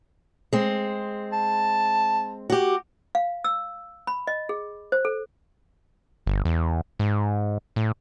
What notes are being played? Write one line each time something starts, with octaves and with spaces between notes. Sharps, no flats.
G#3 C4
A5
F#4 G4
F5
E6
B5
D#5
G#4
C5
A4
G1
E2
G#2
A2